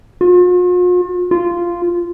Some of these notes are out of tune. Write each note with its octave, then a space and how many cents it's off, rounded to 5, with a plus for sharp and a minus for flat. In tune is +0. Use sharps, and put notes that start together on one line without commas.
F4 +45
F4 -10